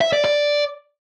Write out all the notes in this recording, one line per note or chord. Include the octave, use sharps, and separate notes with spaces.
E5
D5
D5